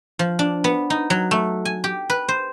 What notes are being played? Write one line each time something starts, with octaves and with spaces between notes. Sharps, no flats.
F3
D4
B3
D#4
F#3
A3
G#5
G4
B4
C5